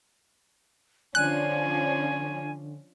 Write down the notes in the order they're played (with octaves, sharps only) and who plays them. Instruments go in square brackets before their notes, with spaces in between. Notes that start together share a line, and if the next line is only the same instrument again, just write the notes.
[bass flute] D3 [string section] F3 C#4 D4 [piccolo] G#5 [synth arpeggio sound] F#6